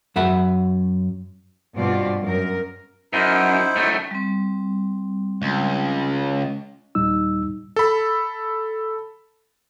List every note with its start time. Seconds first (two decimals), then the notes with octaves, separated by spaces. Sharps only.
0.16 F#2 E5 F#5 B5
1.74 G2 B2 C4 F4 D5
2.21 F#2 A#4
3.13 F#2 D#4 E4 C5
3.76 F#2 A3
4.11 G3 C4
5.42 C#2
6.95 D#2 A#2 G3 D#4 E6
7.76 A4 B5